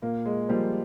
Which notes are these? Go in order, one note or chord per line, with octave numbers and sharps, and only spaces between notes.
A#2 A#3
G#3
F3 G3 A#3 F4 C5